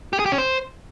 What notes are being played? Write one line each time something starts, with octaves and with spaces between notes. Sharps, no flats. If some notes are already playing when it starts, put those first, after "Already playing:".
G4
G#4
G4
C#4
C5